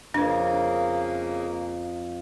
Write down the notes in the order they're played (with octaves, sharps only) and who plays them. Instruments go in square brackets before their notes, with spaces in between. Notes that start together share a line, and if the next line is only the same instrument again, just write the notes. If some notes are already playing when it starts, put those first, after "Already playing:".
[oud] F2 [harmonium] C#3 A#3 [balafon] D4 B4